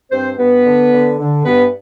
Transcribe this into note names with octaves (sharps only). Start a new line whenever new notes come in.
G2 C4 C5
G2 B3 B4
D3
D3
D3
G2 B3 B4